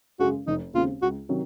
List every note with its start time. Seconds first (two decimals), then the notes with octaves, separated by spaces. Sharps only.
0.19 F#2 C#3 G#3 F#4
0.47 F1 D#4
0.74 D#2 C#3 G#3 C4 F4
1.02 C#2 F#4
1.29 C3 D#3 F#3